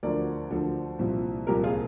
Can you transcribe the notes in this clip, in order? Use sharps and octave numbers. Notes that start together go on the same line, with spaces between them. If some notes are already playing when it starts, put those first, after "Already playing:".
D2 D3 F3 A#4 D5
D2 D3 F3
C2 A#2 F3
C2 A#2 F3 G4 A#4
F4 G#4